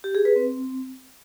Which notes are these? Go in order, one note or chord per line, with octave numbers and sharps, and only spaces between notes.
G4
G#4
B4
C4